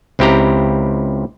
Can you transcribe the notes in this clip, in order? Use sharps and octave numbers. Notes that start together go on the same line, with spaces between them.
C#2 C4 E4 G4 G5 A#5